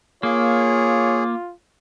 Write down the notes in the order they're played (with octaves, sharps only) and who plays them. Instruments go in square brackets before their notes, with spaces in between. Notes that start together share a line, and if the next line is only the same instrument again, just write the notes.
[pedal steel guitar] A#3 [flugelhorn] F4 [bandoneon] G#4 [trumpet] C#5